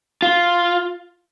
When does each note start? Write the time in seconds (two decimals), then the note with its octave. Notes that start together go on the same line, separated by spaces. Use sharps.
0.22 F4